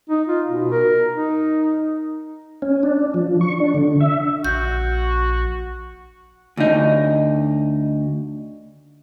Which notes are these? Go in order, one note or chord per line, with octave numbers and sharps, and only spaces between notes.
D#4
F4
B2
A#4
D#4
C#4
D4
F3
C#6
D4
D3
E5
A#1 F#4 G6
D2 D#4